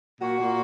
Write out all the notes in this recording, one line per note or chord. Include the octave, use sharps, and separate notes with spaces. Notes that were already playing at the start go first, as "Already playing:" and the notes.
A#2 F#4
A#2